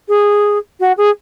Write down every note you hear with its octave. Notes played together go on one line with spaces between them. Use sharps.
G#4
F#4
G#4